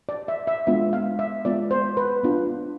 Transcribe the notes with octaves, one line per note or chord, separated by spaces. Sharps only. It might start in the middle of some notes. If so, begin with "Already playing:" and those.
D5
E5
E5
G#3 B3 D4 F4 E5
F5
E5
G#3 B3 F4 D5
C5
B4
B3 D4 F4